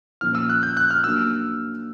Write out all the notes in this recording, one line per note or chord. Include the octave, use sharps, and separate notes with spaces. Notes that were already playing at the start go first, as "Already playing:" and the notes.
A#2 F3 A#3 C#4 F6
E6
F#6
G6
F#6
F6
F#3 A#3 D4 E6